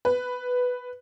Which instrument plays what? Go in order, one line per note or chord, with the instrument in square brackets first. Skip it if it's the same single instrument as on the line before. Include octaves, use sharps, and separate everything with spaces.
[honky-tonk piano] B4